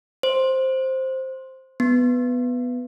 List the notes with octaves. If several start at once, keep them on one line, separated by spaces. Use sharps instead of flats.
C5
B3